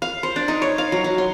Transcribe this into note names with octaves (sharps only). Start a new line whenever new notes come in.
F5
C5
D4
D#4
C#5
F5
F#3
F#3
C6